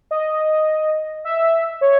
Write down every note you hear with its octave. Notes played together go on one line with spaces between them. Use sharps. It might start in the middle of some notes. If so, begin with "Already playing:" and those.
D#5
E5
C#5